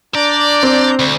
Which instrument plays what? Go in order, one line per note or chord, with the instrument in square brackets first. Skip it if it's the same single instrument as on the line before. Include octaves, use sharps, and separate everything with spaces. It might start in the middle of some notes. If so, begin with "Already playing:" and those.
[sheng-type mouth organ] D4 A#5 G6 [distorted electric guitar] D5
[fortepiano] C4
[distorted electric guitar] D2